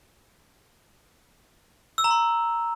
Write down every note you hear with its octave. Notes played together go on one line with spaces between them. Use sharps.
E6
A#5
C6